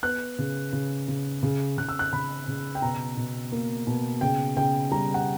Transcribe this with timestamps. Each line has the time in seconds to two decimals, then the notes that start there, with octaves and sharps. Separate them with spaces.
0.03 B3 F#6
0.39 C#3
0.73 C#3
1.08 C#3
1.43 C#3
1.78 C#3 F#6
1.89 E6
1.99 F#6
2.13 C#3 B5
2.48 C#3
2.75 G5
2.82 B2 A#5
3.17 B2
3.52 A#3
3.87 B2
4.21 C#3 G5
4.57 C#3 G5
4.91 G3 A#5
5.14 F#5